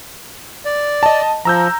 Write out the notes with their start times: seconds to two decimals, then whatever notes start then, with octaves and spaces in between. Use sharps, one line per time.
0.65 D5
1.03 D#5 A5
1.45 F3 A#5 E6 G6